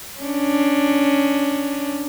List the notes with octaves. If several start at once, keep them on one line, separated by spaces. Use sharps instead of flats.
C#4 D4